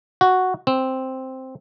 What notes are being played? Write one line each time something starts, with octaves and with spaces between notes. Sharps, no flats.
F#4
C4